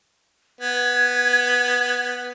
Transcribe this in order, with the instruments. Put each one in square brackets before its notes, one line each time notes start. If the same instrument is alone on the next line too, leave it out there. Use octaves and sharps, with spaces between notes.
[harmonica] B3 [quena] G#6